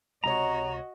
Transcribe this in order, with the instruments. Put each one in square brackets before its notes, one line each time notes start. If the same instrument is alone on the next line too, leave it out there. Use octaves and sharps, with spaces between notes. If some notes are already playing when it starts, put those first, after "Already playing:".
[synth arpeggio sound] C#2 C3 C#5 [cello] F#4 D#5 [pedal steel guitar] A#5